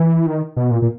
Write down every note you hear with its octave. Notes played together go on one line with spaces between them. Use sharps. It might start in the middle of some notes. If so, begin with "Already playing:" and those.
Already playing: E3
D#3
B2
A#2
A#2